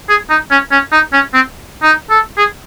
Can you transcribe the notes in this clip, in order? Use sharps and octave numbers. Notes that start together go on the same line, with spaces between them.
G#4
D#4
C#4
C#4
D#4
C#4
C4
D#4
A4
G#4